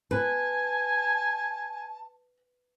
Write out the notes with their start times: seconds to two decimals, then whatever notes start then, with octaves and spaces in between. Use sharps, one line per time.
0.11 B4 G#5 A5